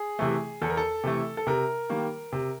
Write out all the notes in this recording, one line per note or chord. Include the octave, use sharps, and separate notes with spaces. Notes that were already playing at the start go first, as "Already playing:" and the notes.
Already playing: G#4
C3 E3 A3
E2 A4
A#4
A4
C3 E3 A3
A4
C3 A#4
D#3 G3 A#3
C3